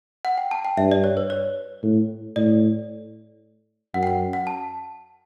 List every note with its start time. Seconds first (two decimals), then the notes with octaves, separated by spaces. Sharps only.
0.25 F#5
0.38 G5
0.51 A5
0.65 G5
0.77 G2 E5
0.91 D5
1.04 C#5
1.17 B4
1.30 C#5
1.83 A2
2.36 A2 D5
3.94 F#2 F#5
4.03 G5
4.07 F#5
4.33 F#5
4.47 A5